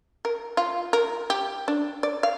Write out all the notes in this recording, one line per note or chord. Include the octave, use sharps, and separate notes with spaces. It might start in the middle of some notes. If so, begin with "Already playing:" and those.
A#4
F4
A#4
G4
D4
D5
F5